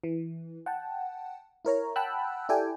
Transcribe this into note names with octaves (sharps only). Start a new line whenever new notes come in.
E3
F#5 G5 A5
E4 A#4 C#5 A#5
F#5 G5 A5 B5 E6 F#6
E4 G4 A4 D5 G5 G#5